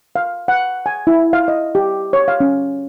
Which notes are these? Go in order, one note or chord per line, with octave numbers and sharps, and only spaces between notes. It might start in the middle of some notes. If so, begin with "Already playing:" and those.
F5
F#5
G#5
E4
F5
D#5
G4
C#5
F5
C#4